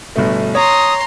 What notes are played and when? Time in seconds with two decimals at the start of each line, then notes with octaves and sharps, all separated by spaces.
0.16 G1 B2 A3
0.55 C#5 A#5 C6 D#6